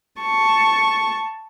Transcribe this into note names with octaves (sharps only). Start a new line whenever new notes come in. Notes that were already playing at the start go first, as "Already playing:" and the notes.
A5 C#6